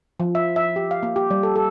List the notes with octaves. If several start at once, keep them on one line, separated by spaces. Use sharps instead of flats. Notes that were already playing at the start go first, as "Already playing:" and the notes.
F3
E5
E5
G4
F5
A#3
G4
G3
A4
A4